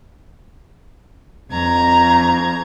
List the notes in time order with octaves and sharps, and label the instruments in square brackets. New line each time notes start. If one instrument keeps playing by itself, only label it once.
[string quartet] F2 A#5 G#6